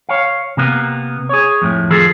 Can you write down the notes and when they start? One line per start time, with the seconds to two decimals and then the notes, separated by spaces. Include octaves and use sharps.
0.09 C#5 F5
0.57 C3 A#3 B3
1.29 G#4 C#5
1.62 F2 A2
1.90 D#3 F3 G#4 A4